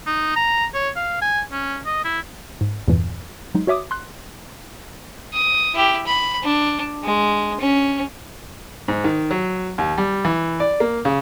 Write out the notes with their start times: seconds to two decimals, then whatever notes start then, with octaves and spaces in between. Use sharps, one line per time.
0.06 D#4
0.36 A#5
0.74 C#5
0.96 F5
1.21 G#5
1.52 C#4
1.85 D#5
2.04 E4
2.61 G#2
2.88 E2 G2 A#2 E3
3.55 F#3 G#3 D#4
3.67 F#4 C#5 E5 D6 D#6
3.91 C6 F#6
5.34 D#6
5.74 E4 G4
6.07 B5
6.43 D4
7.04 G#3
7.61 C#4
8.88 G#2
9.04 D#3
9.31 F#3
9.78 D#2
9.98 G3
10.25 E3
10.60 D5
10.80 A#3
11.05 C#3